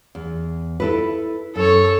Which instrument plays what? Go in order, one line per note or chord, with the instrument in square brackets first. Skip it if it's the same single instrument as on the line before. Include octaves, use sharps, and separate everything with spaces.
[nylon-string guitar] E2
E4 A4 B4
[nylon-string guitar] F#2 [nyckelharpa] A4 C#5